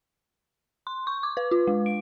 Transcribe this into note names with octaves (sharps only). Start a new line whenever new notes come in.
C6
C#6
D6
B4
F4
G#3
D7